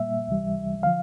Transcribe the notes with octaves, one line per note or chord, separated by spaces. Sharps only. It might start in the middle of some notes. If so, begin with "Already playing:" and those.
Already playing: A#2 G3 A#3 E5
C#2 C3 E3 G3
D3 F3 F5